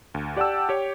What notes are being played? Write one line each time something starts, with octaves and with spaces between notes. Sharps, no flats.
D2
G4 D5 F#5 G5 A5 E6
G4 C#5